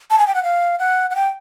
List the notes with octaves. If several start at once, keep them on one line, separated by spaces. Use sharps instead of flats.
A5
G#5
G5
F#5
F5
F#5
F#5
G5